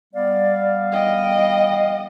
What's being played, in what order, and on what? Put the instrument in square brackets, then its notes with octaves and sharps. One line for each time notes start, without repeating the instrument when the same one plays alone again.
[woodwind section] G3 B3 F5 [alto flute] D5
[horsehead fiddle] D#5 [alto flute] G5